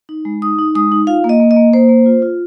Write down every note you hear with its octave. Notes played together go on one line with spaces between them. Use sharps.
D#4
G#3
D#4 D#6
D#4
G#3 D#6
D#4
F4 F5
A#3
D#5
A#3
D#5
A#3
A#3 C5
A#3
F4
F4